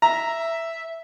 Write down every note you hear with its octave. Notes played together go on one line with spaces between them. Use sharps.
E5 A#5